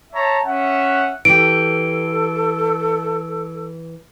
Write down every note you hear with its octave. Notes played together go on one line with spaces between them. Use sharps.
C#5 E5 A5 A#5
C#4 E5 F#5
E3 G4 A4 D7